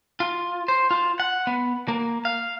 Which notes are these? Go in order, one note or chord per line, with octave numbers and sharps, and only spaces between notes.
F4
C5
F4
F#5
B3
A#3
F5